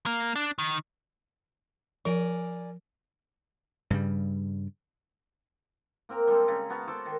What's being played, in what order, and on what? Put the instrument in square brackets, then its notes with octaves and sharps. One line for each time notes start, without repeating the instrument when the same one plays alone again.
[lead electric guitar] A#3
D4
D#3
[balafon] F3 [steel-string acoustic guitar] A#4 D5 G#5
[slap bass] G2 C#3 G3
[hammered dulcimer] A#3 C4 A#4 A#5
G3 G#3 C4 A4
C#3 A#5
B3 F#4 F5 A5
A4 C5 A5 D6
D#3